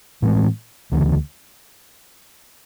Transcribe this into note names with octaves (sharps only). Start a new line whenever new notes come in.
A2 E3 G#3 C4
D2 C#3 E3